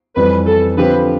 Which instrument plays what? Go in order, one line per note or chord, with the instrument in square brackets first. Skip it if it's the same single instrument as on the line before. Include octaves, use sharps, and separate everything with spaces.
[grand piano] F2 E3 G3 [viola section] B4
[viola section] A4
[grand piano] D3 F3 C4 G4 C5 [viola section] B4